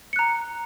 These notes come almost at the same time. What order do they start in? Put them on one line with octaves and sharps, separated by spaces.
C#7 F#6 A#5